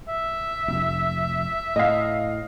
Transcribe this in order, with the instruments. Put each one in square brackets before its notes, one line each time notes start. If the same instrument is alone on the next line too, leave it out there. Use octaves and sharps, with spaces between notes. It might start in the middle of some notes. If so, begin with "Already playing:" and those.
[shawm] E5
[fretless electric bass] F1
[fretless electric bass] A2 [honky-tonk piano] D#5 F5